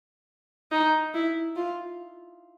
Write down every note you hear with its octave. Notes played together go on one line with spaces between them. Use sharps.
D#4
E4
F4